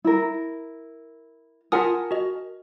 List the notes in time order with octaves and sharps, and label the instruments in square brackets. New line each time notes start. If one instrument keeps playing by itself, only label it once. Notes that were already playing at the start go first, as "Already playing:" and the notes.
[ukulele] E4 A#4
[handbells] F4 F#5 D#6 [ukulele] A#4 G#5 A5
[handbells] F#4 D#5